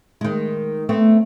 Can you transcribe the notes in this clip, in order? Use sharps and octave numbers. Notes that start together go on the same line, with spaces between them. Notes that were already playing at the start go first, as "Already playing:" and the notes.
D#3 G#3
A3 B3 C4